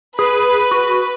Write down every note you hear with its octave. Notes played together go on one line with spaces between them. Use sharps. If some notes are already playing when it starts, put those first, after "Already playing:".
G#4 B4
F#4